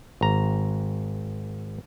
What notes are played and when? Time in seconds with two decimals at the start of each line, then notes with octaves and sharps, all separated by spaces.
0.21 G#1 A#5